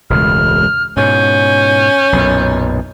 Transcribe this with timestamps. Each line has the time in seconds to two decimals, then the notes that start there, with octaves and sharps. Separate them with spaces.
0.10 E1 C#2 A2 F6
0.97 G#2 B2 C#4 G6
2.13 B1 F#2 A#2